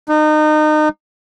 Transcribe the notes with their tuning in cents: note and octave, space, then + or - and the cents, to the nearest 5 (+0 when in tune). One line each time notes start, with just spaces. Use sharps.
D#4 -30